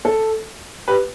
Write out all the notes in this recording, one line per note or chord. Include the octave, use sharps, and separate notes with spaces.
A4
G4 B4